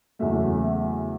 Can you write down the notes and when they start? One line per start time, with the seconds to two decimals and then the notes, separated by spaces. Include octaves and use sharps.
0.19 E2 C#3 F#3 A3 E5
0.64 E5